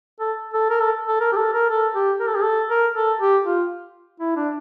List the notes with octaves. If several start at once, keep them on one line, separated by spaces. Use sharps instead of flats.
A4
A4
A#4
A4
A4
A#4
G4
A4
A#4
A4
G4
A#4
A4
G4
A4
A#4
A4
G4
F4
E4
D4